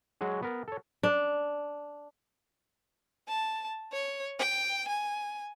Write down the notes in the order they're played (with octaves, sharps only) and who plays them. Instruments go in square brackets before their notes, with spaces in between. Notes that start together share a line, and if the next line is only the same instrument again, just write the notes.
[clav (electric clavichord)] F#3 G#3 F#4 G#4
B3 A#4
A4 C#5
[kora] D4
[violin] A5
C#5
G5
G#5